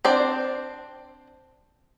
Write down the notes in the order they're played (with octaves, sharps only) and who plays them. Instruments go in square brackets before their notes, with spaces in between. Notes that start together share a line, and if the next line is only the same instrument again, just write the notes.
[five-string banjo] C4 D4 C5 D5